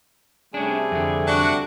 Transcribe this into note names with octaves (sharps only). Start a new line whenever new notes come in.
C3 G3 A3 C#4 D4 G#4
F2 D3
D4 F#4